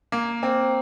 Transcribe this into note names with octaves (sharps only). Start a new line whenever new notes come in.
A#3
C4